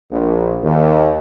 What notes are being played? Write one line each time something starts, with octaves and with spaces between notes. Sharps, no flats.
A#1
D#2